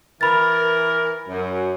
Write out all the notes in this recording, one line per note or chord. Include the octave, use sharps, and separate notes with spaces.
E3 A#4 B5 A6
F#2